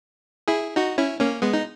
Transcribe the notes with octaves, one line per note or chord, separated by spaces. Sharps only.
E4 G#4
D#4 F#4
C#4 E4
A#3 C#4
G#3 B3
D#4